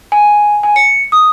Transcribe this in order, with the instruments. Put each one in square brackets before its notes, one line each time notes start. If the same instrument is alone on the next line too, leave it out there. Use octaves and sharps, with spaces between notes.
[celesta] G#5
G#5
C#7
D#6